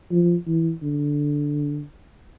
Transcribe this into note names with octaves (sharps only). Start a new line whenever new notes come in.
F3
E3
D3